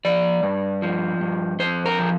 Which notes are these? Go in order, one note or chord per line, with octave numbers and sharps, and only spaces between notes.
F3 D5
G2
F3
G2
F2 C5
A#4
F3